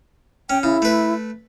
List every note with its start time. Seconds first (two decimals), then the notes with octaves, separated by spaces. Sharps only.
0.50 C#4 G5
0.63 C#3 E4
0.82 A3 B4